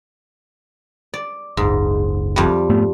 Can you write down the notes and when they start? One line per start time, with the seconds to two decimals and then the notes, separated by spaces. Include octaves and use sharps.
1.14 D5
1.57 F#1 C#2 G#2
2.36 F2 G3
2.69 G#2 A3 B3